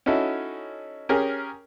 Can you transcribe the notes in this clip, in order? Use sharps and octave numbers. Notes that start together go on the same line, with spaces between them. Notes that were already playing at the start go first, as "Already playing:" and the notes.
C#4 D#4 E4 F#4 A4
C#4 G4 G#4 A#4